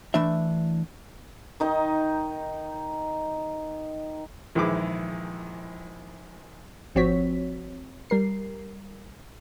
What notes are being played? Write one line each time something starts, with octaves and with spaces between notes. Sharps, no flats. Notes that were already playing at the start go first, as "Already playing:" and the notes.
E3 A3 D4 E5
D#3 D#4 D#5
A#1 D#3 E3 G#3 E4 D6
G#1 F3 C4 F#4 C#5 B6
G3 A#4 C7